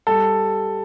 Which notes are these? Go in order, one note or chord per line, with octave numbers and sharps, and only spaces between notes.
G3 A4